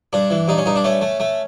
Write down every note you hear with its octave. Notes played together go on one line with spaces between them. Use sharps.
G2 D4
E3
G2 D#4
C#4
G2 D#4
D4
A3 C#4
A3
A3